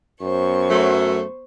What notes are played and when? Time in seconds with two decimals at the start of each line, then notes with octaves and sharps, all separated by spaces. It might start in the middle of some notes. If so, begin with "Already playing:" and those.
0.22 F#2 B3 C5 C#6
0.69 F#3 A3